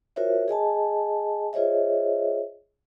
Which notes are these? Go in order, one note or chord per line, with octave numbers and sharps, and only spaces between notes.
F4 F#4 A#4 C5 C#5 E5
G#4 D#5 G#5 A5
F4 G#4 C5 C#5 D#5 E5